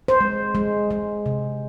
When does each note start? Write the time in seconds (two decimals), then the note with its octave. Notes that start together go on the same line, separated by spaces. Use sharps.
0.08 C5
0.21 G#3
0.55 G#3
0.91 G#3
1.26 C3